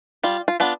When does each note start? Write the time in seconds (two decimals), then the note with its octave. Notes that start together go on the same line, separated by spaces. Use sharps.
0.23 G3 F4
0.48 F4
0.60 B3 D4 F4